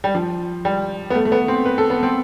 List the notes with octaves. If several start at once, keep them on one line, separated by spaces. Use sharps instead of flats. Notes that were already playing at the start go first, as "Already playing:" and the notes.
G3
F3
G3
B3
A3
A3
B3
C4
B4
A4
B3
C4